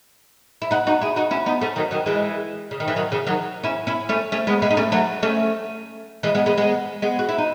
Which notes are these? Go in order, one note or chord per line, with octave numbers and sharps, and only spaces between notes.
E4
D#4 F#4
D#4 F#4
E4 G#4
D#4 F#4
C#4 E4
B3 D#4
A3 C#4
D#3 F#3
D#3 F#3
E3 G#3
C#3
D#3
E3
D#3 F#3
C#3 E3
D#3 F#3
C#4 E4
C#4 E4
A3 C#4
A3 C#4
G#3 B3
G#3 B3
D#4
A3 C#4
F#3 A3
A3 C#4
E3 G#3
G#3 B3
G#3 B3
G#3 B3
G#3 B3
F#4
E4
D#4